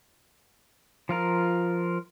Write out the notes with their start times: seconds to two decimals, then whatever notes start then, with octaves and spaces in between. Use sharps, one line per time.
1.09 F3 F4 A#4